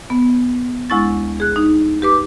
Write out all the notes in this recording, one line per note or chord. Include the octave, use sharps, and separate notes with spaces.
B3
D2 G#3 E4 C#6 A6
G#4 F#6
D#4
G4 B4 D6